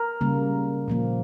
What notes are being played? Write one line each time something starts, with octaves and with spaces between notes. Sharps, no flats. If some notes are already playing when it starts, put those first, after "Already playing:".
Already playing: A#4
C#3 G3 A#3
A#2 F3 A#3